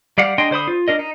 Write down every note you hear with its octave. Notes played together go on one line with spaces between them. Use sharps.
G3 D5 F5 F#5
G#3 D4 D#5 G5 C6
D3 C5 B5 D#6
F4
D4 A#4 D#5
D#4